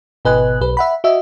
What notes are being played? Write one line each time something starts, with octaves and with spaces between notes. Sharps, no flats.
G#1 B2 B4 D#5 G#5 F#6
B1 B4
E5 F#5 B5
F#4 D#5 E5